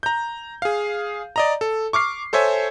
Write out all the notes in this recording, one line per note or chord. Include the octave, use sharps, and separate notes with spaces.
A#5 G6
G#4 F5
D5 D#5 A#5
A4
C#6 D6 F6 C7
A4 C5 C#5 E5 G#5